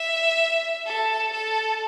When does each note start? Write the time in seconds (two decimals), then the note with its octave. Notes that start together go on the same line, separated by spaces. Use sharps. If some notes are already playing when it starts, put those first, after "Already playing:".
Already playing: E5
0.85 A4
1.32 A4